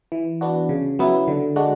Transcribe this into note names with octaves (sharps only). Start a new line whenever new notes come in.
E3
B3 D4 F#4
C#3
F#3 B3 E4
D3
G#3 D4 F#4